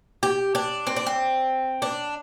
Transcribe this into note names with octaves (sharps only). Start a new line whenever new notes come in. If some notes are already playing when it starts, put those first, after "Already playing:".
G4
D4
C4
D4
C4
D4